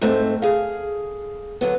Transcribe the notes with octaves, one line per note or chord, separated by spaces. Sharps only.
G#2 A3 C4
G#4 F5
D3 F#3 B3